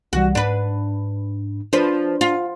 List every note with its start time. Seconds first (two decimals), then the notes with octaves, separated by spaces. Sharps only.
0.13 C2 E3 G3 F#4
0.35 G#2 D4 B4
1.73 F3 D4 B4
2.21 F4